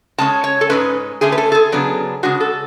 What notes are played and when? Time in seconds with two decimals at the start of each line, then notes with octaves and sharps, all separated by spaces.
0.18 C#3 G#3 C#4 A5
0.44 C#5
0.61 A4
0.70 G#2 E3 G#3 C#4 B4
1.21 D3 A3 C#4 G#4
1.32 B4
1.38 A4
1.52 A4
1.55 G#4
1.72 C#3 F#3 B3 D4
2.23 C#3 G#3 D4 F#4
2.40 A4